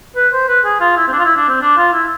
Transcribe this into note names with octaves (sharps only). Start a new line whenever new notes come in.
B4
C5
B4
G#4
F4
E4
C4
D4
F4
E4
D4
C4
D4
F4
E4